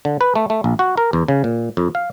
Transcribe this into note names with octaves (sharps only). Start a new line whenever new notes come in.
D3
B4
A3
A3
A#1
F#4
A#4
E2
C#3
A#2
F2
F5